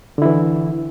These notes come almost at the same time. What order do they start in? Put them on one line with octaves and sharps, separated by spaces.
D3 E4 E3